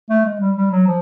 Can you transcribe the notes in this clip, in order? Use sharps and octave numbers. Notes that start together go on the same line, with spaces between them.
A3
G#3
G3
G3
F#3
F3